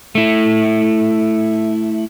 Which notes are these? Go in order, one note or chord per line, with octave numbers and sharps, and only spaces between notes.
A3 E4